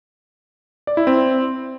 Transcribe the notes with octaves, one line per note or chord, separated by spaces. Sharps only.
D5
E4
C4